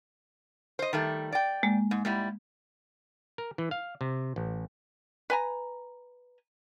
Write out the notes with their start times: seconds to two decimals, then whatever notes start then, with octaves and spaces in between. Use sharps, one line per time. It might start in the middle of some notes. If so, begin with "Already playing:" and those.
0.79 C5 D#5
0.93 D#3 G3 A3
1.32 D5 G5
1.63 G#3 A#3
1.91 G#2
2.05 G#2 G3 E4
3.38 A#4
3.58 E3
3.71 F5
4.01 C3
4.36 A1
5.30 B4 G#5 A#5